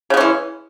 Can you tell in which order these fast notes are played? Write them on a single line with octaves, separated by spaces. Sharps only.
C#3 G#3 C#4 E3